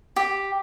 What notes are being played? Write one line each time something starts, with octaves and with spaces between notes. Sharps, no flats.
G4